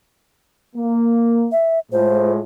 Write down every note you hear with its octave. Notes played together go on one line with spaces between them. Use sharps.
A#3
E5
A2 G#3 F4 C5